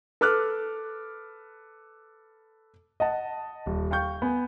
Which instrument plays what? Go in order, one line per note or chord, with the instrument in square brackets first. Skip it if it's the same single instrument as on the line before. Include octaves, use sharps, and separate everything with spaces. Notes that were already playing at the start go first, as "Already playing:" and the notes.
[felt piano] A4 B4 D6 F6 F#6
[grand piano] D#5 F#5 A5
D#1
F5 G5 C#6 G6
B3 G#5